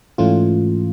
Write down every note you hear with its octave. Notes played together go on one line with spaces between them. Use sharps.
G#2 E3 A3 C#4 F4